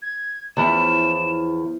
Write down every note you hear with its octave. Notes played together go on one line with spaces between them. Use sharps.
G#6
E2 F3 C#4 E4 E7